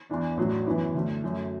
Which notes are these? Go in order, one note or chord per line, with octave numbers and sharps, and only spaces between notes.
E2 E3 D4
A1 A2 F#3 D4
F#2 E3 B3 E4
D2 D3 A3
F#2 F#3 A3